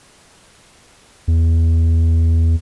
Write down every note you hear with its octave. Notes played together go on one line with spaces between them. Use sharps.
E2